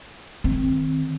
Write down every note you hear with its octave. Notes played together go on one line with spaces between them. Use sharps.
D#3 C4